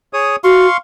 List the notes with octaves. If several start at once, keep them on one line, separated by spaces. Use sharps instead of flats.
G#4 C#5 D#6
F#4 F5 C6 C#6